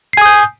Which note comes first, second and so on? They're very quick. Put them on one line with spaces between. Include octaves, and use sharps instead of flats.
C7 G#5 D#6 G6